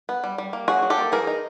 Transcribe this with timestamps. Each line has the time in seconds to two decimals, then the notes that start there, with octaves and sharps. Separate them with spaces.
0.09 B3
0.24 G3
0.38 G3
0.53 A#3
0.68 F#3 F#4 G#4
0.82 F#3
0.90 G4 A4
0.98 A#3
1.12 E3 G#4 A#4
1.27 D#4